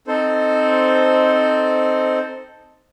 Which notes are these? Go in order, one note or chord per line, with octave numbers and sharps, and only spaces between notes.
C4 D#4 A4 C5